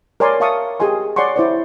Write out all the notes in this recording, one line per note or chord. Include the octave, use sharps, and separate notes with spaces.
A#4 C#5 D5 G#5 C6
A#4 E5 F5 A5 C#6 D#6
G4 G#4 D#5 G#5 C6
C#5 D5 F#5 G#5 C6 C#6
E4 C5 D5